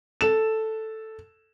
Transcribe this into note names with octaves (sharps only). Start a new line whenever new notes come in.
A4 E7